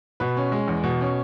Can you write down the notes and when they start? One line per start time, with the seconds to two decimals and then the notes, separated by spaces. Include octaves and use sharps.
0.20 B2 B4
0.37 C#4
0.52 G#3
0.68 E2
0.84 B2
1.01 C#4